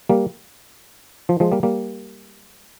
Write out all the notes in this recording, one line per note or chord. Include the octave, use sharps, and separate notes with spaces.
G3 A#3
F3
F3 G#3
G3 A#3
G3 A#3